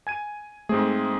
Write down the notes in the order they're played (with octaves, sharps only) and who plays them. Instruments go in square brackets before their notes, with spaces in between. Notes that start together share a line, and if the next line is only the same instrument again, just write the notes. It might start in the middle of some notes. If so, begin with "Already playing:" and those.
[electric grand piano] G#5 G#6 D#7
[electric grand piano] G#2 C4 G#4 [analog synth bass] A3